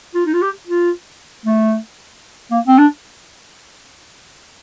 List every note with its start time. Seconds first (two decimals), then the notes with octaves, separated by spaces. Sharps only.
0.15 F4
0.26 D#4
0.34 F4
0.42 G4
0.67 F4
1.46 A3
2.51 A#3
2.68 C4
2.78 D4